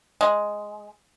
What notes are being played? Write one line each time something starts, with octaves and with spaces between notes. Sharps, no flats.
G#3